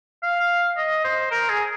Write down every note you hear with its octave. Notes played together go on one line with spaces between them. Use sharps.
F5
D#5
C5
A#4
G#4